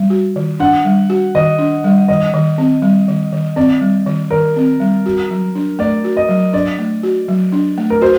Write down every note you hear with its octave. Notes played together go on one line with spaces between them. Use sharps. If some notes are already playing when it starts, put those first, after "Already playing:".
Already playing: G3
F#4
D#3
D4 F#5
G3
F#4
D#3 D#5
D4
G3
D#3 D#5
D#3
C4
G3
D#3
D#3
C4 D5
G3
D#3
D#3 A#4
C4
G3
F#4
F#3
D4
A3 D5
F#4
D#5
F#3
D4 D5
A3
F#4
F#3
D4
A3
A#4
F#4 C5